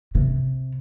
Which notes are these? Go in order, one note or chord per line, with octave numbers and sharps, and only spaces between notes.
C3